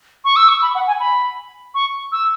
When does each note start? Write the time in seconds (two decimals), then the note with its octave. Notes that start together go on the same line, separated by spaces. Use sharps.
0.24 C#6
0.36 E6
0.48 C#6
0.62 B5
0.75 F#5
0.87 G#5
1.00 B5
1.74 C#6
2.12 E6